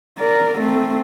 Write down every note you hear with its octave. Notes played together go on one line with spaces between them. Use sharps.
A#4 D5
A3 C4